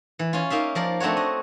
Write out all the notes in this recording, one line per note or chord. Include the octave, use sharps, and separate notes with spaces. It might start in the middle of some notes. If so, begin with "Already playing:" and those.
E3
C#4 F4
A#3 D#4 E5 F5
F3 A#4 D5
A3 C4 D4 F#4 C#5
D#5